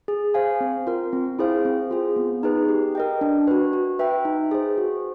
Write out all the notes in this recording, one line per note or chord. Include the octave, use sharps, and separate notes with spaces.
G#4
C5 F5 G#5
C4
F4 A#4
C4
E4 G#4 C5 F5
C4
F4 G#4
B3
D#4 G#4 B4
G4
A#4 D#5 G5
D4
F#4 B4
F#4
B4 E5 G5
D#4
G#4 C5
F#4